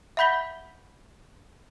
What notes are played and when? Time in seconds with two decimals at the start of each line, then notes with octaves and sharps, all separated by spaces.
0.17 E5 F#5 B5 G6 B6 G7